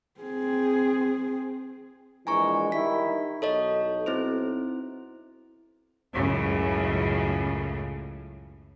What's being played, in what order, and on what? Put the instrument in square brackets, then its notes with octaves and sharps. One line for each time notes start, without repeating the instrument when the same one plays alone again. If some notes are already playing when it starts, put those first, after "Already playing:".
[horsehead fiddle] C4 G#4
[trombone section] A#1 E3 G#3 [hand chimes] G#5 A#5 C#6
[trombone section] D#3 G3 E4 [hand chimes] B6
[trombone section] B1 [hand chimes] A4 C#5 D#5
[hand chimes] C4 E4 C5
[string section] C#2 F#2 A2 C#3